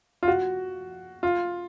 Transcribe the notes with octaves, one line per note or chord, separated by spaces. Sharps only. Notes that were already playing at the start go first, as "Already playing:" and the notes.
F4
F#4
F4